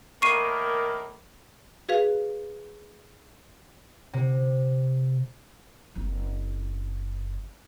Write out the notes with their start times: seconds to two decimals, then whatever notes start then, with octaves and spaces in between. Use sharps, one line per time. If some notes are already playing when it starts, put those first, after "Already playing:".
0.22 A2 D#3 A#3 C#6 C7 D#7
1.89 F#4 G#4 B4 F5
4.13 C3
5.95 F#1 C4